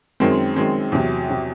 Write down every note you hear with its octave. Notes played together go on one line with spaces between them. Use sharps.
F#2 D#3 G#3 C4
F#2 D#3 G#3 C4
E2 C3 F#3
C3 F#3